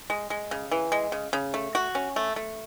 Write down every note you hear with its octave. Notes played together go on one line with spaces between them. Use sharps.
G#3
G#3
C#3
E3
G#3
C#3
C#3
A3
F#4
C#4
A3
A3